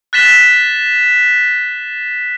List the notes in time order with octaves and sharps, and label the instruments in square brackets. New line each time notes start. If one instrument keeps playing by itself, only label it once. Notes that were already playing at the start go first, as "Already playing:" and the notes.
[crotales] F#6 A6 B6 E7 G7